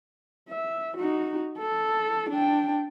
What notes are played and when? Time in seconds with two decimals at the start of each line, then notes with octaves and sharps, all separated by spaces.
0.49 E5
0.97 D#4 F#4
1.58 A4
2.30 D4 G5